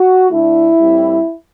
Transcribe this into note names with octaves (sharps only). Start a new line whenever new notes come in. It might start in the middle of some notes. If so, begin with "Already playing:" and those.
Already playing: F#4
D3 A3 D4 E4
A2 G3 C4